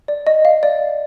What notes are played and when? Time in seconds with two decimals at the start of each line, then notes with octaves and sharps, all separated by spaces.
0.08 D5
0.27 D#5
0.45 F5
0.63 D5